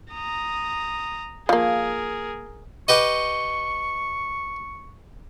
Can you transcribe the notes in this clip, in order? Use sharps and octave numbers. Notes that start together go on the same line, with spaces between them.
A#5 D#6
F3 A#3 G#4 A#4
G4 B4 D#5 C#6